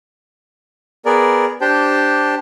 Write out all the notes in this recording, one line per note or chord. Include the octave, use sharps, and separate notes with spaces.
B3 G#4 A#4 D5
D4 G4 C5 G5 A5